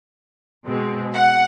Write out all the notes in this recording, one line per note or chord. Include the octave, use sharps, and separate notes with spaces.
B2 G#3 C4
F#5